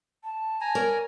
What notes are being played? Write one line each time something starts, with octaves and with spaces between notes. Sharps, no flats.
A5
G#5 A#5
A#4 C#5 D5